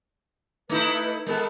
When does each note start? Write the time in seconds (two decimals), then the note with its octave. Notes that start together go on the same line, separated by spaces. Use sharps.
0.69 A3 D#4 E4 B4
1.27 G#3 B3 A4 A#4